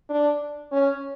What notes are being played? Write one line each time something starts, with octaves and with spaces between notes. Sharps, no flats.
D4
C#4